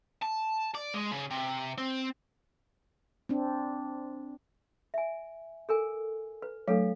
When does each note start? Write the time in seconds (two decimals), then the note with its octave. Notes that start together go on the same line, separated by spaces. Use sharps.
0.22 A5
0.75 D5
0.94 G#3
1.12 C#3
1.31 C3
1.78 C4
3.29 C4 D4
4.94 E5 G#5
5.69 A4 A#4 G#5
6.42 B4
6.68 F#3 A3 D4 A4 F5